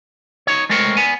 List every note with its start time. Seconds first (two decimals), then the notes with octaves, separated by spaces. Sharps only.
0.47 D#4 C#5
0.70 G#3 A3 C4 A#4 C#5
0.97 B3 G#5